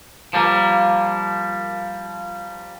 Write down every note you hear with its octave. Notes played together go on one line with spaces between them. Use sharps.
F3 G3 A#3